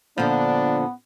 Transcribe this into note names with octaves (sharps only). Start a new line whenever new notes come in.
A#2 D3 F3 B3 D4